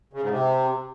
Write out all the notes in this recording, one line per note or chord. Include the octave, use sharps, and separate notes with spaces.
C#3
G#2
C3